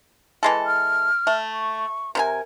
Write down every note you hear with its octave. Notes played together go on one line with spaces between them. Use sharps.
E3 G#3 A4
F6
A3
C#6
C3 E4 A#4 G#5